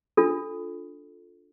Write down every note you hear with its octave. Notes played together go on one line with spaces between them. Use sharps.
D4 F4 A4